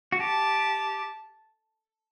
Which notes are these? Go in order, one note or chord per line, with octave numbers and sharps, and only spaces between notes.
F#4
G4 A5